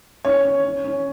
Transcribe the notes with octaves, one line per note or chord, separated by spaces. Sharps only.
C#4 C#5
C#4
C#4
C#4